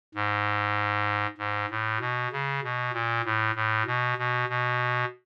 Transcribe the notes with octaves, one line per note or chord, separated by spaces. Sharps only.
G#2
G#2
A2
B2
C#3
B2
A#2
A2
A2
B2
B2
B2